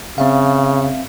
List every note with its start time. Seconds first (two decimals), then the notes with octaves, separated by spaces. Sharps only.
0.18 C#3 C4 E5 F5